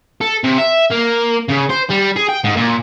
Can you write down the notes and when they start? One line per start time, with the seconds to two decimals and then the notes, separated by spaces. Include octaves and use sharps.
0.21 A4
0.44 C3
0.58 E5
0.91 A#3
1.50 C#3
1.70 C5
1.90 G3
2.16 G#4
2.29 G5
2.44 G#2
2.56 A#2